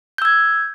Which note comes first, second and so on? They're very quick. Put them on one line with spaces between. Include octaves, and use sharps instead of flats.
G6 E6 G#6